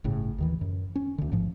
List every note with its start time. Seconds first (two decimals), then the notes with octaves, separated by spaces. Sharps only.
0.04 G1 A2 C#3
0.38 D#2 D#3 E3
0.61 F#2
0.96 C#4
1.18 D2 D3
1.32 A1 G#2 F3